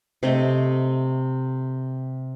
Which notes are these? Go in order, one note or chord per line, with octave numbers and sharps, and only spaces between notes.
C3 A3 D#5